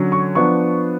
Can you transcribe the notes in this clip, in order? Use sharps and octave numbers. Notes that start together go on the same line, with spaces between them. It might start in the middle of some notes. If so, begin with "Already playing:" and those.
Already playing: D3 F#3 C#4
C#6
F3 B3 D4 C#6